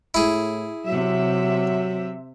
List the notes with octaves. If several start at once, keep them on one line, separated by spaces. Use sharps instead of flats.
A2 E4 G#4
C3 F#3 E5